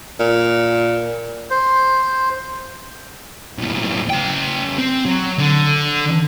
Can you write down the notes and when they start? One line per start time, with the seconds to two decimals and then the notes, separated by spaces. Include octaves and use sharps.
0.19 A#2
1.50 C5
3.58 B1 A2
4.10 C#3 G5
4.78 C4
5.06 F#3
5.38 D3